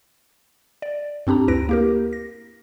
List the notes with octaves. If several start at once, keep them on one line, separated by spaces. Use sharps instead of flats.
D5
G2 C4 D4 G4 A#5
D2 E4 B4 A#6 D7
A#3 G4 A#4
A#6